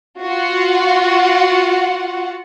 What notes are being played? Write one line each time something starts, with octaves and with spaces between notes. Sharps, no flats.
F4 F#4 F#5